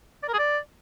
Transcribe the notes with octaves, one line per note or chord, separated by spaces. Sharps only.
D5
A#4
G#4
D5